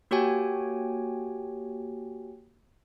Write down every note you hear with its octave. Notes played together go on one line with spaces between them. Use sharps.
A#3 F#4 G4 C#5 G5 G#5